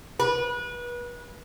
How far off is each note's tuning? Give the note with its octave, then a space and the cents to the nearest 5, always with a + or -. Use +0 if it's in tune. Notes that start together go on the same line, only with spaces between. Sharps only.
B4 -30